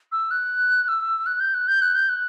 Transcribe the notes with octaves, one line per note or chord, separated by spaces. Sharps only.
E6
F#6
E6
F#6
G6
F#6
G6
F#6
G6
F#6